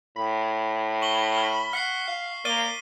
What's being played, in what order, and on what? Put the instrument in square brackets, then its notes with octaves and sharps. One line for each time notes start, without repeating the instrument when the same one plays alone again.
[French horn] A2 [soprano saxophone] B5
[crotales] C#6 F#7 G7
F6 G7
[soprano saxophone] F#5 [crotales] F6 B6 C7
[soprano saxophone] F5
[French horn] A#3 [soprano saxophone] D5 [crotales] F6 D#7 G7